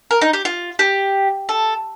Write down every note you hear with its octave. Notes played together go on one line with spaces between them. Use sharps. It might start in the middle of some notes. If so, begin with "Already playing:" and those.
A#4
D#4
G4
F4
G4
A4